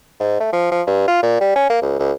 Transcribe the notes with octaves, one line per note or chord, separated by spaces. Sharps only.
G#2
A3
F3
F3
G2
F4
A#2
G3
C#4
A#3
C#2
C#2